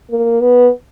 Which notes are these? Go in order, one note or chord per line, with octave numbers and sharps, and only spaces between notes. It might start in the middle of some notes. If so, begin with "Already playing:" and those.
A#3
B3